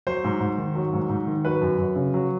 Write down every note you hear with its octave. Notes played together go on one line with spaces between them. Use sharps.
F#3 C5
G#2
G#2
D#3
F#3
G#2
G#2
D#3
F#3 B4
F#2
F#2
C#3
F#3